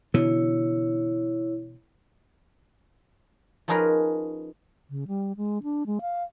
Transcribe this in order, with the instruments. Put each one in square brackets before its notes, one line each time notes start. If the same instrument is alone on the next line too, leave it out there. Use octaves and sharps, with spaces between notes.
[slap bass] B2 D3 E3 [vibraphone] E4 C#5
[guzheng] F3 C#4 D#4 G#4 A#4 B4
[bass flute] C#3
G3
G#3
D4
G#3
F5